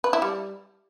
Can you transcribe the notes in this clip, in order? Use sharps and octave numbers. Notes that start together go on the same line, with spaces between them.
B4
E4
G3